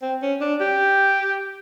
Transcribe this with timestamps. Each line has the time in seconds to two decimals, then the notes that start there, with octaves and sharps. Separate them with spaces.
0.02 C4
0.22 C#4
0.41 D4
0.61 G4